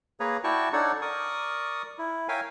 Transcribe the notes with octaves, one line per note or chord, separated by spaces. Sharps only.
A#3 G#4 B4 C#5 A#5
E4 F#4 D5 G5 A5 C#6
D4 D#4 A4 C#5 D5 F#5
A#4 D5 C#6 D#6
E4
A#4 C#5 E5 F5 G5 G#5